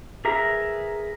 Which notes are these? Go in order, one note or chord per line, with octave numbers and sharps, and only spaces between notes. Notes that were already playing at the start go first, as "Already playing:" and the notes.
G#4 A#4 B4 E5 A#5